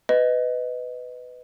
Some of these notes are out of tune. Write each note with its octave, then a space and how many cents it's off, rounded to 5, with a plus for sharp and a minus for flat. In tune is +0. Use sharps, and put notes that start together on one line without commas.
B4 +15 D#5 +0